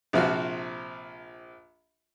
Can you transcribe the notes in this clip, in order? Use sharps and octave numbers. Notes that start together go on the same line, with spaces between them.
A#1 C3 F3 F#4